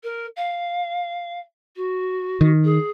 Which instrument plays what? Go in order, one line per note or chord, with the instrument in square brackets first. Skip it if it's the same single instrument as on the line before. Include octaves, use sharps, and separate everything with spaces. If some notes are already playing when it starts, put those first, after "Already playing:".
[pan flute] A#4
F5
F#4
[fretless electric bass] D#3
[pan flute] G#4